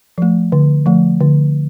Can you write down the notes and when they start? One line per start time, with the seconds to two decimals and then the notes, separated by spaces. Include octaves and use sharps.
0.18 F3 A3
0.52 D3
0.86 F3 A3
1.20 D3